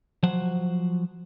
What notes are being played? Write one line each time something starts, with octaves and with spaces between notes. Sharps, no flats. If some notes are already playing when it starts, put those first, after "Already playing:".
F3 F#3 C5 F#5